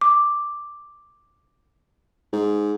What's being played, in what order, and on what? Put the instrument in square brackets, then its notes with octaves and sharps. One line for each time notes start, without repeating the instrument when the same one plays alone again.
[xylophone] D6
[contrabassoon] G#2